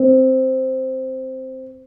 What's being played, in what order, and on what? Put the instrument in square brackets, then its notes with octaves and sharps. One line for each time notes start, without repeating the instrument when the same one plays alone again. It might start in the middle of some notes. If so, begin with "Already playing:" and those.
Already playing: [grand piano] C4